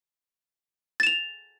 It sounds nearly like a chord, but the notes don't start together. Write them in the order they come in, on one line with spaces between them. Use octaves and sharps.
A6 E7 F7